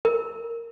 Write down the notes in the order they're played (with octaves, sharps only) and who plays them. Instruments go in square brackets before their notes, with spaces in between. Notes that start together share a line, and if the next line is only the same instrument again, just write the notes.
[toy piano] A#4